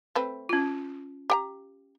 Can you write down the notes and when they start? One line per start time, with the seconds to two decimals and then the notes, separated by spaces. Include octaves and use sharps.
0.15 A3 C4 B4
0.49 C#4 F4
1.30 G4 G5 A#5